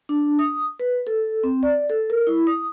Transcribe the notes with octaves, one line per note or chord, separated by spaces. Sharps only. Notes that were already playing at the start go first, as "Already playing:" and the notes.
D4
D#6
B4
A4
C4
D5
A4
A#4
E4
D#6